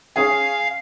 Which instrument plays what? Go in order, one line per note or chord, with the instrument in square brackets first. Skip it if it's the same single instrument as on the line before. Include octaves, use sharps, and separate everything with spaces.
[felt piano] C#4 G#4 G#5 [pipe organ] F5